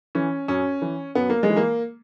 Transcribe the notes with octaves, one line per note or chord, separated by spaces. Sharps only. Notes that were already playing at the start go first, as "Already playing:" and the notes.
E3 C#4
F#2 C#4
E3
F#2 B3
A#3
G#3
E3
A#3